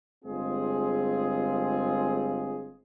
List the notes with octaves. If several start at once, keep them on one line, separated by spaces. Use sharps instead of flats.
G1 G#3 C4 F4 G#4